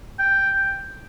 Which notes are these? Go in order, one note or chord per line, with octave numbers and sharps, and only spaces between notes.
G5